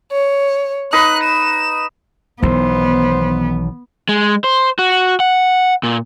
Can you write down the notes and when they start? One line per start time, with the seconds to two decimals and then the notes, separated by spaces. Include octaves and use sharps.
0.12 C#5
0.93 D#4 B4 F#6
1.23 E7
2.43 B1 D#3 E3 B3 C5
4.09 G#3
4.44 C5
4.79 F#4
5.20 F#5
5.83 A#2